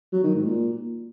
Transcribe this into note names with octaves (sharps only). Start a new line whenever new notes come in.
F#3
D#3
G#2
A#2